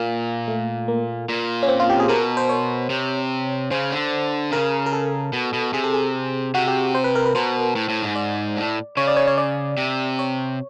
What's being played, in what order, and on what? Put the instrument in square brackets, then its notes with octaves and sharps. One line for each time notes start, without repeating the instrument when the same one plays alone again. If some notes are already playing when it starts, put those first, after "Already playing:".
Already playing: [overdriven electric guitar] A#2 [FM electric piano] A#3
[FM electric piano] A3
A#3
[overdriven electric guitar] A#2
[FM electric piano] C#4
C4
F4
G4
G#4
[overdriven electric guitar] B2 [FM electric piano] A#4
[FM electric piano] C5
C#5
[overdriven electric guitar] C3
[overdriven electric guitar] C#3 [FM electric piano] C5
[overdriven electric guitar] D3
[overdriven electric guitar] C#3 [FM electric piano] A#4
[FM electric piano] A#4
A4
[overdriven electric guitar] B2
B2
[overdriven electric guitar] C3 [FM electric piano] G#4
[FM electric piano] A4
G#4
[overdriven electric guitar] C3 [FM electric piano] F#4
[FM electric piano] G4
C5
B4
A#4
B4
[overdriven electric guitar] B2 [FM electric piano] C5
[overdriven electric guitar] A2
A2
G#2
[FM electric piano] D5
[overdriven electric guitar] A2
[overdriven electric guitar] C#3 [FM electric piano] C#5
[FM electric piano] D5
C#5
C#5
D5
[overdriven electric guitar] C3
[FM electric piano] C#5